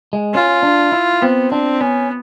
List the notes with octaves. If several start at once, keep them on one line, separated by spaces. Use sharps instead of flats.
G#3
C#4 F4
D4
E4
B3 C4
C4 D4
B3 C#4